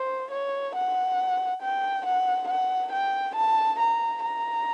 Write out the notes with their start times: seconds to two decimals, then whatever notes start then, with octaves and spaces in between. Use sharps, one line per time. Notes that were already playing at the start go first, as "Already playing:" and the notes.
Already playing: C5
0.32 C#5
0.76 F#5
1.63 G5
2.06 F#5
2.49 F#5
2.93 G5
3.36 A5
3.80 A#5
4.23 A#5